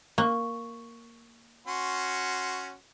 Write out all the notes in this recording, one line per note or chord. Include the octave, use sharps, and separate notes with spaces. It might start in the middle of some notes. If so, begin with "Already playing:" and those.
A#3 C#6
C#4 F#4 C6